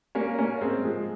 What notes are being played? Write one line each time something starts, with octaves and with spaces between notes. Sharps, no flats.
A#3 C#4
A#3 C#4
G#3 C4
F3 G#3